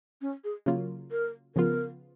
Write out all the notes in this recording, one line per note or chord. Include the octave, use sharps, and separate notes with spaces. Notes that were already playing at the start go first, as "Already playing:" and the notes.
C#4
G#4
C#3 F#3 A#3 F4
A#4
C#3 F3 B3 F4 A#4